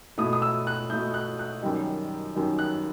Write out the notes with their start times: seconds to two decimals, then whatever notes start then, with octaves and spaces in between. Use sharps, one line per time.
0.18 B2 A3 E4 D#6
0.33 D#6
0.42 E6
0.67 F#6
0.90 B2 A3 E4 G6
1.14 F#6
1.39 F#6
1.62 F#2 D#3 G3 D#4
2.35 F#2 D#3 G3 D#4
2.59 F#6